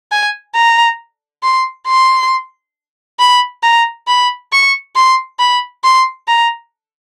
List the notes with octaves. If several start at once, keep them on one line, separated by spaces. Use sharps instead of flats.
G#5
A#5
C6
C6
B5
A#5
B5
C#6
C6
B5
C6
A#5